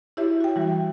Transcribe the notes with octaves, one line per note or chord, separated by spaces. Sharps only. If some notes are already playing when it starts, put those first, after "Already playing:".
E4 F#4 G4 C#5 E5
F#4 G5
E3 G3 F#4